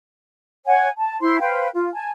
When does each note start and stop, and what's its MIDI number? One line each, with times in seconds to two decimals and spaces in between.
0.66 0.88 73
0.66 0.88 78
0.66 0.88 80
0.98 1.20 81
1.21 1.38 64
1.21 1.38 72
1.21 1.38 84
1.40 1.68 71
1.40 1.68 72
1.40 1.68 77
1.40 1.68 79
1.73 1.88 65
1.93 2.11 80
1.93 2.11 81